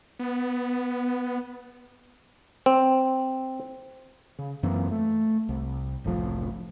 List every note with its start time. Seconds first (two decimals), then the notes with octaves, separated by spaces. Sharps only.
0.20 B3
2.66 C4
4.39 C#3
4.63 F#2 E3 A#3 C4
4.91 A3
5.49 C2
6.04 F#1 C2 A2 F3